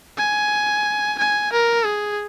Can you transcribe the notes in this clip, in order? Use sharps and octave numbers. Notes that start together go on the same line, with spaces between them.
G#5
G#5
A#4
G#4